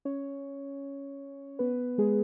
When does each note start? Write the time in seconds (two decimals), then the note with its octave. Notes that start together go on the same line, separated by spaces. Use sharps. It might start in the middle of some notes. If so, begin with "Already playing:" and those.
0.05 C#4 C#5
1.59 B3 B4
1.98 G#3 G#4